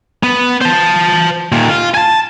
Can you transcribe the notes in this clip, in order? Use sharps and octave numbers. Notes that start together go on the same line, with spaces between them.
B3
C5 A5
D#2 A#2
F4
G#5 A5